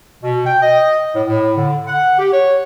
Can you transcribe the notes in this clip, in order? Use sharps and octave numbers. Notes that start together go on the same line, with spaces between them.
B2
G5
D#5
A2
A2
D3
F#5
G4
C#5